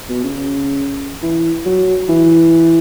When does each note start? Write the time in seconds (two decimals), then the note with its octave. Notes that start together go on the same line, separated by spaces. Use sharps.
0.09 B2
0.24 C#3
1.22 E3
1.66 F#3
2.09 E3